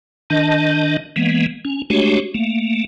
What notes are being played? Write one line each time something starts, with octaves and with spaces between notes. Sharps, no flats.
D#3 D4 D#5 A5
E3 G#3 A#3 B3
C#4
G#3 A3 D4 F#4 G4 C#5
A3 A#3